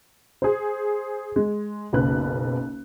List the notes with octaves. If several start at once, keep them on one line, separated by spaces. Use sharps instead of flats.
G#4 C5
G#3
F#1 B1 B4 F#6